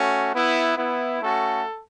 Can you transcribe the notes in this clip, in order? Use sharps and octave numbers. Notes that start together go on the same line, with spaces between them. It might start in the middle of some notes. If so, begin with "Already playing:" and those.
Already playing: A3 C#4 F#4
B3 E4
B3 E4
A3 C#4 F#4 A4